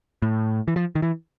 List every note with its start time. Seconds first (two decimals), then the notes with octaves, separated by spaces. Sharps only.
0.22 A2
0.68 E3
0.76 F3
0.95 D#3
1.02 E3